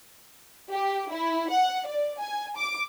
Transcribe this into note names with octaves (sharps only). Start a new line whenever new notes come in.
G4
E4
F#5
D5
G#5
D6